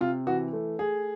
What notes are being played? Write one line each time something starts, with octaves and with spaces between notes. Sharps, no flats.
C3 F4
E3 F#4
A3
A3 G#4